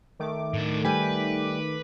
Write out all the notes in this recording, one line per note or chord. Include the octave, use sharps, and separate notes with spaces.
D#3 A3 D6
A2 D4
G3 B4 G5 G#5